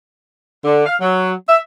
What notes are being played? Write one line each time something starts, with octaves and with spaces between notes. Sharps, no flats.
D3
F5
F#3
E5